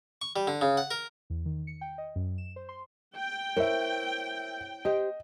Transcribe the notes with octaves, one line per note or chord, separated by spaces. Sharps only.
C#6
G3
D3
C#3
F#5
A#4
E2
D#3
C#7
G5
D#5
F#2
E7
C5
C6
G5
E4 A#4 C5 C#5 E5
G4 C5 D#5